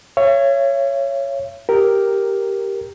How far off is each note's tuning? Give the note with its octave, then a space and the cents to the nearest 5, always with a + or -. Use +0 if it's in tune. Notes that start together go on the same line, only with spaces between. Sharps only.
C#5 +0 E5 +45
G4 +0 A#4 +0